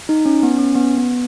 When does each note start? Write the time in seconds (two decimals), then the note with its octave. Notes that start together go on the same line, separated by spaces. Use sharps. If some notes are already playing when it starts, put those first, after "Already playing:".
0.09 D#4
0.25 C#4
0.43 B3
0.58 C#4
0.75 B3
0.98 B3